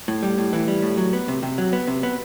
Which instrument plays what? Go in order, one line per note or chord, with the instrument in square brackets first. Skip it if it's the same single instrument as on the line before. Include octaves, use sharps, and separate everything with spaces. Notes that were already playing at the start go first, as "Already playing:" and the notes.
[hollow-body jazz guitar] A2
G3
A2
E3
G3
A2
F#3
B3
C3
C3
F#3
B3
C3
B3